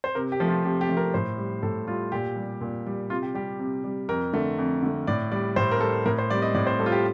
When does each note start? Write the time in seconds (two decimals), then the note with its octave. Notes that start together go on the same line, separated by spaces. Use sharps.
0.04 C5
0.15 C3 A#4
0.32 G4
0.40 F3 A3
0.49 F4
0.64 C3 G4
0.81 G4
0.89 F3 A3
0.97 A#4
1.14 A2 C5
1.38 G3
1.63 A2 A4
1.87 G3 F4
2.12 A#2 G4
2.36 G3
2.61 A#2
2.86 G3
3.10 C3 F4
3.22 G4
3.34 G3 G4
3.59 C3
3.84 G3
4.09 F2 A#4
4.33 D3 A3
4.58 F2
4.82 D3 A3
5.07 A2 D5
5.32 G3 D5
5.56 A2 C5
5.71 A#4
5.80 G3 A4
6.06 A2 A#4
6.18 C5
6.30 G3 D5
6.42 D#5
6.54 A2 D5
6.67 C5
6.79 G3 A4
6.86 F4
6.92 G4